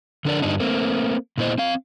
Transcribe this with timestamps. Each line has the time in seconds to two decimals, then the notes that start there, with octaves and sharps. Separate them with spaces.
0.25 D3 D4 A#4 D5
0.42 G2 D3 D4 D#4
0.60 A3 A#3 C4
1.38 A#2 B3 E4 C5 D#5
1.58 C4 F5